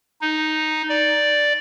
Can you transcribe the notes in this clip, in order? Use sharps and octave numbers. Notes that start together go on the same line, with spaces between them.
D#4
D5